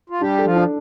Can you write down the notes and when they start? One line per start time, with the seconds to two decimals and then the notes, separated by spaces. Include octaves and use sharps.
0.10 F4
0.21 G3 D4 G4
0.39 A4
0.45 F3 F4
0.57 D4